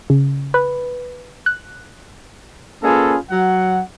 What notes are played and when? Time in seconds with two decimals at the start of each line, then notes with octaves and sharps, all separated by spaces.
0.10 C#3
0.54 B4
1.46 F#6
2.83 A#3 C#4 F4 G#4 A4 B4
3.31 F#3 F#5